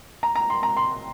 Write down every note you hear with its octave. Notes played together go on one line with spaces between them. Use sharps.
A#5
A#5
C6
A#5
C6